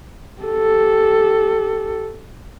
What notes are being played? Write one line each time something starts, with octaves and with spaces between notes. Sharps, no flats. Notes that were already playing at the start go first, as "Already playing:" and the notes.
G4 A4